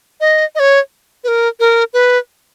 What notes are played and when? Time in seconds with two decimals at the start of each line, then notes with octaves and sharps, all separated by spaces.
0.21 D#5
0.55 D#5
0.59 C#5
1.24 B4
1.28 A#4
1.60 A#4
1.94 B4